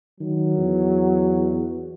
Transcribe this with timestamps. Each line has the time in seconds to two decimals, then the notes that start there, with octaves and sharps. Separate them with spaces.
0.20 D#3 F#3
0.58 E2